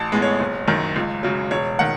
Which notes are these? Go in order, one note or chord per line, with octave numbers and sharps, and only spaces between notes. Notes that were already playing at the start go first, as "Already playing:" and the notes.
Already playing: A1 A5
A2 G#3 B3
C#5
F#1
F#2 D#3
C#2
C#3 F#3
E1 C#5
D#3 F#5